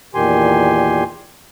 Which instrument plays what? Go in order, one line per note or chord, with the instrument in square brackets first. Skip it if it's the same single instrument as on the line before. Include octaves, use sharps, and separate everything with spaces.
[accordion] E2 A#2 D#3 G4 G#5 C6